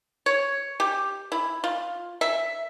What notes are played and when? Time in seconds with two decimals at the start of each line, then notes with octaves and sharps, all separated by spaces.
0.26 C#5
0.80 G4
1.32 E4
1.64 F4
2.21 E5